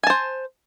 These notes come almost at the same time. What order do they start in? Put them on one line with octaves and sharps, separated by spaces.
G#5 A5 C5